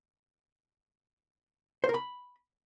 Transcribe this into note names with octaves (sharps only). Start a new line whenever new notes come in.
C5
A#4
B5